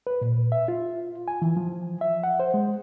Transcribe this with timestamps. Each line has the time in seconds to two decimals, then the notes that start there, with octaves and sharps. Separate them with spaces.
0.07 B4
0.21 A#2
0.52 E5
0.68 F4
1.28 G#5
1.42 E3
1.57 F3
2.01 E5
2.23 F#5
2.40 C5
2.54 G#3